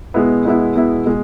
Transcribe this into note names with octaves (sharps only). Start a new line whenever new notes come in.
B2 G#3 B3 E4
B2 G#3 B3 E4
B2 G#3 B3 E4
B2 G#3